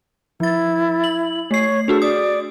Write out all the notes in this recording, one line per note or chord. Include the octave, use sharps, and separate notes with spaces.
F3 E4 A6
F#7
A3 C#5 C7
D4 F#4 G#4 A4
D5 D#6